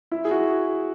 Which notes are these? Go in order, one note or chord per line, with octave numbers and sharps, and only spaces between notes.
E4
G#4
F#4